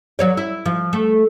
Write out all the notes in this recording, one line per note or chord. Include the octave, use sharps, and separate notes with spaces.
F#3 C#5 D5
E4
F3
A3